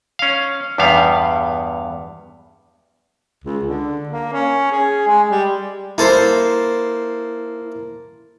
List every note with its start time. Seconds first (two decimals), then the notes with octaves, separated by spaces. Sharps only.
0.19 C#4 F5
0.78 E2 G2 G3 B3 F5
3.44 C#2
3.65 D3
4.09 A#3
4.33 C#4
4.72 G#4
5.07 G#3
5.30 G3
5.98 A#3 E4 A4 C5